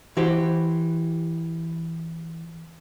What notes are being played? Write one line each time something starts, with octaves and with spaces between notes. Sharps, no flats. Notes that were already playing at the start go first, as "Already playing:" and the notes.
E3 F#4 G4 C5